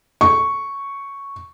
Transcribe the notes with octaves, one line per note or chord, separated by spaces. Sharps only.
C#6